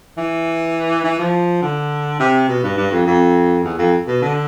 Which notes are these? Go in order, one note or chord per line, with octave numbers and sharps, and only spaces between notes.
E3
E3
F3
D3
C3
B2
G2
G2
F2
F2
E2
F2
B2
D3